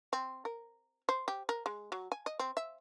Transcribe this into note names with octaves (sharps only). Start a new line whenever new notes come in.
C4
A#4
C5
G4
A#4
G#3
F#3
G#5
D#5
C4
E5